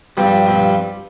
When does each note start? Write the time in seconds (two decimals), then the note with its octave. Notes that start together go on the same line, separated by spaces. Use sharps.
0.17 G2 F3 G3 C4
0.45 G2 F3 C4